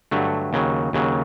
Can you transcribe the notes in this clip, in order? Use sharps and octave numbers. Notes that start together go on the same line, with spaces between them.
G2 D3 F#3 A3
D#2 C#3 F#3
D#2 C#3 F#3